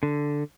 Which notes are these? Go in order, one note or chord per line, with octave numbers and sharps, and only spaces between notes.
D3